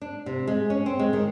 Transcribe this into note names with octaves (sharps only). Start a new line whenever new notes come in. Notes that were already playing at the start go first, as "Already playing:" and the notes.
D4
C3
G#3
C#4
C4
G#3
D#3